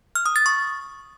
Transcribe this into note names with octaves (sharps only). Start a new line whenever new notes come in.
F6
D#6
A6
C#6